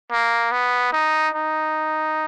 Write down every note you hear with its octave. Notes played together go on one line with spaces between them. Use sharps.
A#3
B3
D#4
D#4